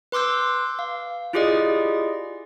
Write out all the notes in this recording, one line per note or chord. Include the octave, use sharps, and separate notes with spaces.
B4 C6 D6 E6 G6
F5
E4 F4 G4 G#4 D5 D#5